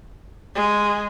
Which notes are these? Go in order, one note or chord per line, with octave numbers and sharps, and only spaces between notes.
G#3